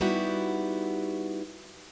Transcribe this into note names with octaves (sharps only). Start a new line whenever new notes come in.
G3 B3 D#4 E4 F#4 G4